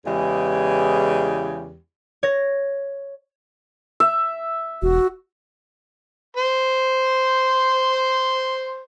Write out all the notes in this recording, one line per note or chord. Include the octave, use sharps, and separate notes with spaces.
E2 C#3 E3 G#3 G4
C#5 A#6
E5
E1 F#4
C5 C6